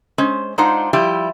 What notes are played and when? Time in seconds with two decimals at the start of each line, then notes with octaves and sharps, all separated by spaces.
0.18 G#3 C#4 C5
0.58 G#3 D4 D#4 F4 C5 F#5
0.93 F3 G3 E4 G4